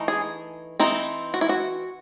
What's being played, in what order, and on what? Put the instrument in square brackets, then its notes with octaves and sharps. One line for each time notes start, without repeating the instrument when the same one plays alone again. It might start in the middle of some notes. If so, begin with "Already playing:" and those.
Already playing: [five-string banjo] E3 A3 D#4
G#4
E3 C4 D#4
F#4
E4
F#4